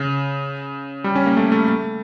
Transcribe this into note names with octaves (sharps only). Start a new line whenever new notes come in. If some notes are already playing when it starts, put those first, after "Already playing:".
Already playing: C#3
G3
C#4
A#3
A3
A3
A3